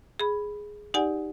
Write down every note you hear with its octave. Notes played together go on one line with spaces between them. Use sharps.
G#4 B5
D#4 G4 D5 F#5 G#5